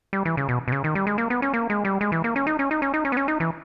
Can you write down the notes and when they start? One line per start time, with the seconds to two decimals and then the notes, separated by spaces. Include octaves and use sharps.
0.13 G3
0.25 E3
0.37 C#3
0.49 B2
0.68 B2
0.72 C#3
0.84 D#3
0.95 G3
1.07 G#3
1.18 A#3
1.30 B3
1.42 C#4
1.54 A#3
1.70 G#3
1.85 G3
2.01 G#3
2.12 E3
2.24 A#3
2.36 C#4
2.47 D#4
2.59 C#4
2.71 D#4
2.82 C#4
2.94 D#4
3.05 C#4
3.12 B3
3.17 C#4
3.28 D#4
3.40 E3